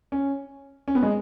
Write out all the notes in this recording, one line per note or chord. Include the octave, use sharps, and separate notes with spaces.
C#4
C#4
B3
G#3